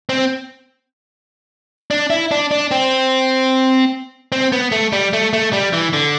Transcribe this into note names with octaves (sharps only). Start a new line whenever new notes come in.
C4
D4
E4
D4
D4
C4
C4
B3
A3
G3
A3
A3
G3
E3
D3